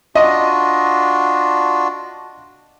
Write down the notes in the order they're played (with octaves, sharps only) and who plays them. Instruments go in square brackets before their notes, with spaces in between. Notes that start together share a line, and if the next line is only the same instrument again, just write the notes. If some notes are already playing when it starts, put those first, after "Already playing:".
[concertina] D4 F4 F#4 [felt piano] D#5